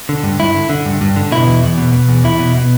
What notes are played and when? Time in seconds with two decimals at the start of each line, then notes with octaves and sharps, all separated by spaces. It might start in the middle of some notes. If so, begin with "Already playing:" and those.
0.09 D3
0.23 G2
0.39 G2 E4
0.55 D3
0.70 D3
0.86 G2
1.01 G2
1.16 D3
1.32 B2 E4
1.47 E2
1.63 E2
1.78 B2
1.93 B2
2.09 E2
2.24 E2 E4
2.40 B2
2.55 B2